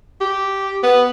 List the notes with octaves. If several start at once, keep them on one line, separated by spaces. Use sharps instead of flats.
G4
B3